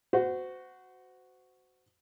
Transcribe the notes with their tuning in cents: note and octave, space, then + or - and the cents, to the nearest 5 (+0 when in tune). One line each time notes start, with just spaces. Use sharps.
F#4 +0 C5 -30